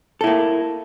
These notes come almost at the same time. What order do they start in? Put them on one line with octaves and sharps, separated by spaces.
A4 E4 A#3